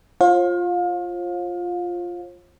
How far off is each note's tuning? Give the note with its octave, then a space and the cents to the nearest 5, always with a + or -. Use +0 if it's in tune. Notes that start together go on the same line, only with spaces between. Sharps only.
F4 +0 C5 +45 F5 +30